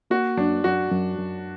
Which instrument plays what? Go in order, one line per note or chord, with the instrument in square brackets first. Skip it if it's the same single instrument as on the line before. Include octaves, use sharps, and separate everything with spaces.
[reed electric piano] A#3 [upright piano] F#4
[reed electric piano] F#2 [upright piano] D4
[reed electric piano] F#2 [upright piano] F#4
[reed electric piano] F#2
F#2